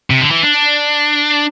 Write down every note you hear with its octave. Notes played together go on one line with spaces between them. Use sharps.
C3
D3
E3
D4